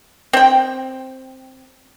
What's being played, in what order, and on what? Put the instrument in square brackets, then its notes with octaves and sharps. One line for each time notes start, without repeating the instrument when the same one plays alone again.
[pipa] C4 G5